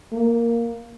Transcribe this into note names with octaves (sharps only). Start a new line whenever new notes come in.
A#3